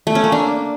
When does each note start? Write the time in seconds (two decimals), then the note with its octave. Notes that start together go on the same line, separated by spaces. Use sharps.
0.07 A3
0.15 C#4
0.24 A#3
0.32 D4